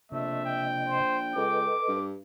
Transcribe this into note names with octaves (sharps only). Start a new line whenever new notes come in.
A#1 C3 A3 D#5 E5
G5
C5
C#2 A4 B4 D#5 D6
G2